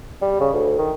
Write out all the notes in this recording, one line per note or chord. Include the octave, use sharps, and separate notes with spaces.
G3
C#3
D2
D#3